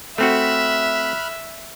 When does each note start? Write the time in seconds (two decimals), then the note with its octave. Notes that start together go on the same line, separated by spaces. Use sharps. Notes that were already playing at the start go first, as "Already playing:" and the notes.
0.18 A3 C4 F#4 E5 B5 F6 F#6